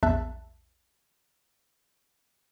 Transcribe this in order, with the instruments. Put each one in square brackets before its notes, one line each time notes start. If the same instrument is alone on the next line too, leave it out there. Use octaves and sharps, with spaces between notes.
[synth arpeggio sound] A#1 E2 E5 A5 F#6